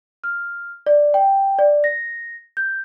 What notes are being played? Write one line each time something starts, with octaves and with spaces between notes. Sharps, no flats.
F6
D5
G5
D5
A#6
G6